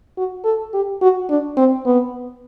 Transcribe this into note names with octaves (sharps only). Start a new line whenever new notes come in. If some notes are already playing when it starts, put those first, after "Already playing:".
F#4
A4
G4
F#4
D4
C4
B3